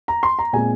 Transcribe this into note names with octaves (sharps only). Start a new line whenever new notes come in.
A#5
C6
A#5
A#2 G#3 C4 G#5